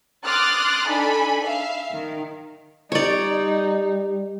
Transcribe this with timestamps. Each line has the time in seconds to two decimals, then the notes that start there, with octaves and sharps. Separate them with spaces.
0.24 C6 D6 D#6 F6 F#6 A6
0.87 D4 D#4 A4 G#5 B5
1.44 E5 F5
1.93 D#3
2.92 G3 D#4 C#5 D5